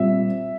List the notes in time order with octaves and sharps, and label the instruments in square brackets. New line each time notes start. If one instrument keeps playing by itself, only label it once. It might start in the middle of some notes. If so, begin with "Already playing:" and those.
Already playing: [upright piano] A#2 G3 C4 E5